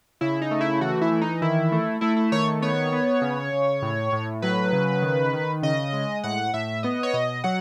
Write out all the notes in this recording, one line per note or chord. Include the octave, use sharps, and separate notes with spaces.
C#3 E4
D#4
A3
E4
E3 F#4
E4
E3
D#4
D#3 E4
A3
A3 E4
E4
D#3 C#5
B3 C#5
B3
C#3
C#3
A2
A2
F#3 B4
C#3
D#3
D#3
C#3 D#5
G#3
A2 F#5
A2 E5
B3 D#5
C#5
B2 D#5
F#3 F#5